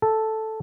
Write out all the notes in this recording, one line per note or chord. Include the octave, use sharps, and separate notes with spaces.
A4